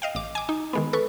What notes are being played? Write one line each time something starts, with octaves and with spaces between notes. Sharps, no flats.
D#5 F5 G5
A1 D6
G#5 D6
D#4
D#3 G#3 B3
A4 B4 C#6